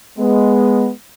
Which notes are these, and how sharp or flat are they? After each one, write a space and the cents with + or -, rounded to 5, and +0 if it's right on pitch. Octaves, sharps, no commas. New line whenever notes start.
G#3 +0 B3 +0